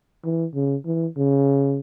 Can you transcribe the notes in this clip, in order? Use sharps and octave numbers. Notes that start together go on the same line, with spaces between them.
E3
C#3
E3
C#3